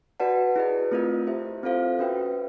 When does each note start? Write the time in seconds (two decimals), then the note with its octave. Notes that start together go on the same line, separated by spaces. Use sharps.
0.20 F#4 B4 D5 F#5 A5
0.56 E4 G#4 B4 D#5
0.91 A3 C4 F4 A#4 D#5
1.27 E4 G4 C5 E5
1.63 C4 F4 A4 C5 F5
1.99 C#4 F#4 B4 E5 G5